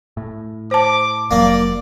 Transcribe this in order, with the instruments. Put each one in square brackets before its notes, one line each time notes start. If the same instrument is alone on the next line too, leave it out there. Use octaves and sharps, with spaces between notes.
[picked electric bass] A2
[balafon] C5 A5 [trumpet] D6
[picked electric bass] F1 F#3 [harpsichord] A#3 [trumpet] D5